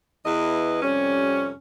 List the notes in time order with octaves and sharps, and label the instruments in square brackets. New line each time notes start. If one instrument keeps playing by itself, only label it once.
[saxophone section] E2 E3 E4 B4 D#5
F2 C3 G3 C#4